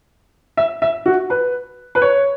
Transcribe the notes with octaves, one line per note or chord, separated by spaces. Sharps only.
E5
E5
F#4
B4
B4
C#5